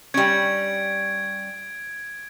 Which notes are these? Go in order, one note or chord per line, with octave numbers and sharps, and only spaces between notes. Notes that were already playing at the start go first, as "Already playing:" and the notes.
G3 C#4 G#6 D7